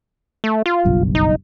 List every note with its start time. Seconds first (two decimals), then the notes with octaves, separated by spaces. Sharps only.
0.44 A3
0.66 F4
0.85 F#1 B1 G2
1.15 D#4